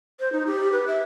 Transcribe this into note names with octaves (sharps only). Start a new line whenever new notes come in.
C5
D#4
G4
B4
E5